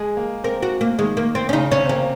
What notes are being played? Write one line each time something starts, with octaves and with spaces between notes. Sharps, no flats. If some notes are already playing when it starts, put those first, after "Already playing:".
Already playing: G#3 G#4
A#3
C4 A#4
F#4
A#3
D#3 G#3
A#3
C4
C#4
C#3 D#4
C3 C#4
C4
A#3 C#4